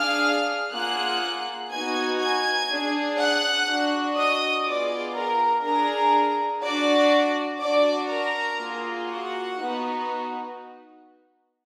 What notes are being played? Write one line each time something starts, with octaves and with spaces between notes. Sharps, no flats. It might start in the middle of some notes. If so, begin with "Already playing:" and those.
Already playing: D4 G#4 F5 F6
A#3 F4 G#4 F#5 F#6
B3 D#4 F#4 G#5 G#6
G#5 G#6
D4 G#4
F#5 F#6
D4 F#4
D#5 D#6
B3 F4 G#4 D5 D6
A#4 A#5
D4 G#4 A#4 A#5
D4 F#4 D5 D6
D4 F#4 D5 D6
A#4 A#5
A#3 F4 G#4
F#4 F#5
B3 D#4 F#4